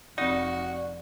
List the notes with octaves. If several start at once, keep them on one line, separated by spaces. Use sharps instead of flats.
F1 C4 D#4 F#4 D5